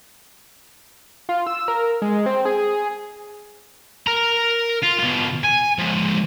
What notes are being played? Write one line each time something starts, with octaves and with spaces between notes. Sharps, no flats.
F4
E6
A#4
G#3
C4
G#4
A#4 A#5
F4
B2 F4
G#5
F3 G#3